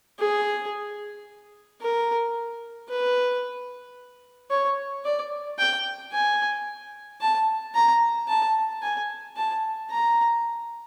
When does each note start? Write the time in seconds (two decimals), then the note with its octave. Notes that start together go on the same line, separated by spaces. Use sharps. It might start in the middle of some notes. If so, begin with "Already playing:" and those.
0.19 G#4
1.81 A#4
2.89 B4
4.50 C#5
5.05 D5
5.59 G5
6.12 G#5
7.20 A5
7.75 A#5
8.29 A5
8.83 G#5
9.36 A5
9.91 A#5